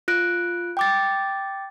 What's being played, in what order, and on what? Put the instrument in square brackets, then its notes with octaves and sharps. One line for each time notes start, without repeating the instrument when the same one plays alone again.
[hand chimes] F4 F#6 D7
G5 D6 A6